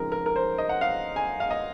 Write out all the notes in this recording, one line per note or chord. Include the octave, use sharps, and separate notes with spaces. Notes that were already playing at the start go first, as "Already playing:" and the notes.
Already playing: C#3 F3 G#3 C4 D#4 A#4
A#4
A#4
C5
D#5
F#5
F5
G#5
F5
D#5